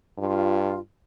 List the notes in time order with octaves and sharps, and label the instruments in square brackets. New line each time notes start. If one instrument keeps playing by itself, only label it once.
[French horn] G2 [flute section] F4